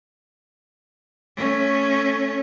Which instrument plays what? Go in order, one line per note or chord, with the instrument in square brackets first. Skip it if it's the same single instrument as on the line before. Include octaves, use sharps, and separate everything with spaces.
[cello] A3 C#4